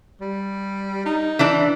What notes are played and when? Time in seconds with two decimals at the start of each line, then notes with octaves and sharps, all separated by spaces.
0.21 G3
1.06 D#4
1.39 E3 D4 D5